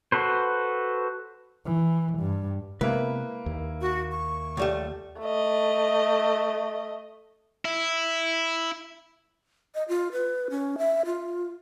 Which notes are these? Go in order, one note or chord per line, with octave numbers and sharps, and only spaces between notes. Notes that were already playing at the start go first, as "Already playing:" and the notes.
F#4 A4 B4 C5
E3
G2
C3 G#3 A#3 B3 E4 B4
D#2
F#4
C#6
C#2 G3 A3
A3 D#5
E4
D#5
F4
B4
C#4
E5
F4